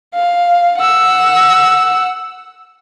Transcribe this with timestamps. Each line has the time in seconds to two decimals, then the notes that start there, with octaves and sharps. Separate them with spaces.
0.14 F5
0.79 F#5 E6